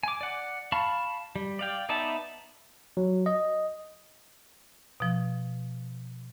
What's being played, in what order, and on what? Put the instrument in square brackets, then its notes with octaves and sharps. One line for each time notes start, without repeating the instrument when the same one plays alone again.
[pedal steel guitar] G#5 D6
D5 F#5
F5 A5 B5 C#6
G3
D5 F5 G5
B3 D#4 D5 E5 A5
[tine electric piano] F#3
D#5
[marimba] B2 F3